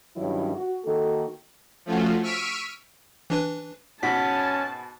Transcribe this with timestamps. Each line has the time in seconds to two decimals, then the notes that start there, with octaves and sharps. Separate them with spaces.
0.17 G2 D#3 F#3 C#4 E4
0.55 F#4
0.84 D#3 A#3 F#4 A4
1.86 F3 A3 C#4 F4 F#4
2.23 C#6 E6 F6 B6 D7 D#7
3.30 E3 D4 B4
4.03 G#2 B2 C#4 F#4 A5 B6